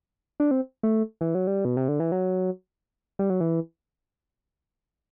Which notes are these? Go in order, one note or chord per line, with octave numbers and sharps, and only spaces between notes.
D4
C4
A3
E3
F#3
G3
B2
C3
D3
E3
F#3
G3
F#3
E3